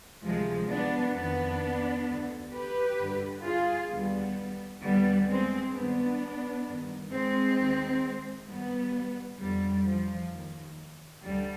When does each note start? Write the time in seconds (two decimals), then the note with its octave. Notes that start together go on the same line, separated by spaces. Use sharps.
0.24 D2 C3 D#3 F3 G#3
0.70 B3 D4
1.16 F2 D#3 B3 D4
2.07 D2 D3
2.52 G4 B4
2.99 G2 D3
3.45 F4 G#4
3.90 D#2 D3 G3 B3
4.82 D#2 D3 G3 B3
5.28 G#3 C4
5.73 G2 D#3 B3 D4
6.66 G2 D#3
7.11 G#3 C4
7.57 D#2 D#3
8.48 G2 D#3 G3 B3
9.41 F2 D3 G3
9.86 F3
10.32 D#2 D#3
11.24 D2 D3 G3